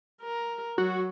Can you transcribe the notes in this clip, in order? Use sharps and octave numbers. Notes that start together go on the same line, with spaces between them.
A#4
F#3 F#4